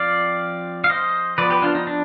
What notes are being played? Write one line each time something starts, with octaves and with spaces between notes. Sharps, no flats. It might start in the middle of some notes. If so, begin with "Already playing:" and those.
Already playing: F3 C4 D5 F5
F5
C5 D#5
F3 B3 B4 D5
G4 B4
D4 F4
D#4
D4